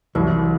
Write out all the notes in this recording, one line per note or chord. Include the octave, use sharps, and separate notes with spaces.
C2 E3 F#3